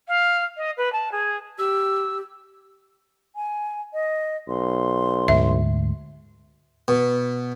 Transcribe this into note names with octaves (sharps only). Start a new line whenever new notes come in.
F5
D#5
B4
A5
G#4
G4 E6
G#5
D#5
B1 C6
D2 G#2 E5
B2